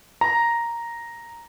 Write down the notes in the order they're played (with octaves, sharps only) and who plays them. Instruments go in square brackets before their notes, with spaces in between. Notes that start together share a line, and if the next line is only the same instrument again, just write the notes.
[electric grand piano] A#5